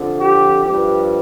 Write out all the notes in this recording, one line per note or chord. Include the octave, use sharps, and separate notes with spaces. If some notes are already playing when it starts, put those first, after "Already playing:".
Already playing: F2 D3 F3
G4
G2 F3 G4